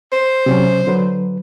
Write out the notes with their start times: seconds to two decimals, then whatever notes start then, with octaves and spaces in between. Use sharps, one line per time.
0.12 C5
0.46 C3 F#3 C#4
0.87 D3 F#3 B4